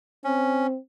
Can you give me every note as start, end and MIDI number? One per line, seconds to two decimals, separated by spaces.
0.25 0.77 60
0.25 0.67 61